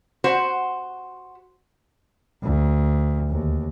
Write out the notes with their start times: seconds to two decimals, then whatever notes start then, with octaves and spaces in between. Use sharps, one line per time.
0.24 F#4 C5
2.43 D2
3.30 D#2